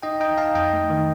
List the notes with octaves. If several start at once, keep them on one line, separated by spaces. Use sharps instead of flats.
D#4 D#5 G5
D#4 D#5 G5
D#4 F5 A5
F2 D#5 G5
A3
D#3